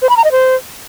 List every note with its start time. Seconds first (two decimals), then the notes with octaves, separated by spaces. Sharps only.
0.02 C5
0.09 B5
0.17 A#5
0.24 D#5
0.32 C5